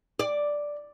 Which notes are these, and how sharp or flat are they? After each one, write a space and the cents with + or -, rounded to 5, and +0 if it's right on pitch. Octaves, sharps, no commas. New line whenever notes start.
D5 +0